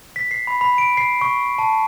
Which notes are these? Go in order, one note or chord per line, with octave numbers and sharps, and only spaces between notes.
B6
C7
B5
B5
D7
C7
C#6
A5